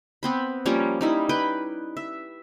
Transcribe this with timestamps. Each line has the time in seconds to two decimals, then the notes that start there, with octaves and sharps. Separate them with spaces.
0.23 B3 C4 B5
0.66 F3 G3 A#3 C#4
1.01 G3 D#4 E4
1.29 B4 G5 B5
1.97 E5